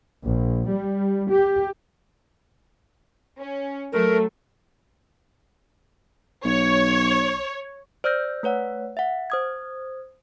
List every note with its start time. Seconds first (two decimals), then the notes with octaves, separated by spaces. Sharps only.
0.23 A#1
0.68 G3
1.30 G4
3.41 C#4
3.92 F#3 A3 A#4
6.45 B1 C#5
8.04 C5 D5 E6 F6 G6 A#6
8.43 A3 B4 C#5 F#5
8.97 E5 F#5
9.30 C5 D#6 G#6